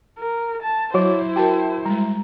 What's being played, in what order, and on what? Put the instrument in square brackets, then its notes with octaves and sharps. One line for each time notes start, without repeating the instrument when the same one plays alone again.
[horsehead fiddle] A#4
A5
[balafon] F#3 [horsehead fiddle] E4 C5 [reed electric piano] F#4 C#5 D6
[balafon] F#4 A#4 [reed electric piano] G5 A5
[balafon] G3 G#3 [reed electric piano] A#5